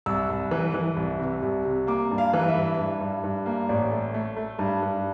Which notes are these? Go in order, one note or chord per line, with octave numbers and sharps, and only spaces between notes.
C2 E6
C2
E3
E3
C2
C3
C2
C3
A#3 D6
G2
F5
E3
E5
G2
G2
G2
G2
A#3
A1 D5
A3
A3
A3
G2
G2